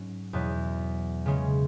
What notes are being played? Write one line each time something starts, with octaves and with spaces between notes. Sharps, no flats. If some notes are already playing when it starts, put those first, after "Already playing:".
Already playing: G#2 F#3 C#4
E2 B2 F#3 B3
C#3 G#3 C#4